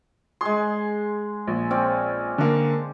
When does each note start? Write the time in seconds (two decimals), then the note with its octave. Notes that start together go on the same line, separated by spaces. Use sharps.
0.41 G#3 G#4 C6
1.47 A#1
1.71 C4 C#4 D5
2.38 D3 A#3